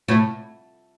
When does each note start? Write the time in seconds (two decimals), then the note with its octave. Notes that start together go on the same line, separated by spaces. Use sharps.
0.08 A2